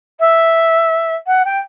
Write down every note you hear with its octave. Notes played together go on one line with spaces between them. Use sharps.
E5
F#5
G5